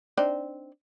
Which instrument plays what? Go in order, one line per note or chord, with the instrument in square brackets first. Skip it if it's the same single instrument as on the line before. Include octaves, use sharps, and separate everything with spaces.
[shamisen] C4 D4 D#4